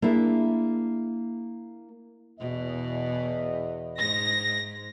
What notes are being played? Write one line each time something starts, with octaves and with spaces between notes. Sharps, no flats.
A#3 D4 E4 G#4
E2 B2 D#5
G#2 A#6